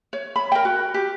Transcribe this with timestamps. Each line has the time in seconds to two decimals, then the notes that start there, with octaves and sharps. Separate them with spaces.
0.13 C#5
0.36 B5
0.52 A#4 G5
0.65 F#4
0.94 G4